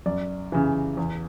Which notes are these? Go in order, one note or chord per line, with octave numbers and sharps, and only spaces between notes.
F#2 D5
C#3 E3
E2